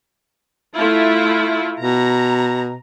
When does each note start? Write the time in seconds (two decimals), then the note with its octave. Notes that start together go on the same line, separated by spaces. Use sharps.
0.77 A3 E4 F4
1.79 B2 A#5